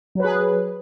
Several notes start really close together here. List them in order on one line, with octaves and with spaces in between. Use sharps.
F#3 B4 G#4